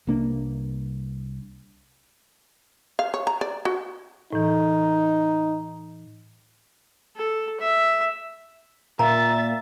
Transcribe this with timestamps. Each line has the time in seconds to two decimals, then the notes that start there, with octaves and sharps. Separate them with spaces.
0.07 C2 A#3 D4
2.99 F5
3.14 C#5
3.27 A#5
3.41 D5
3.65 F#4
4.33 A2 E3 D#4
7.16 A4
7.60 E5
8.99 A#2 E5 A#5 A6